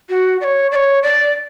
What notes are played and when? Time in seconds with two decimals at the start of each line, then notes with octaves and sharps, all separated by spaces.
0.09 F#4
0.41 D5
0.44 C#5
0.72 D5
0.76 C#5
1.03 D5